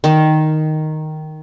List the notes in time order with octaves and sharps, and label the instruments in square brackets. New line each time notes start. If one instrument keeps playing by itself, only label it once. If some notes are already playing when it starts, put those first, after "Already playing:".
[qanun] D#3